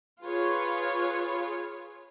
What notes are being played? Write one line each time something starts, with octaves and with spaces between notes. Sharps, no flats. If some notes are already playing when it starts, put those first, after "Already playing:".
F4 G#4 B4 C#5